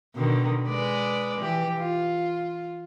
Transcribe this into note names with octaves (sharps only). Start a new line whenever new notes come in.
B2 D3 D#3
G#3 B4 D5
E3 G4
F4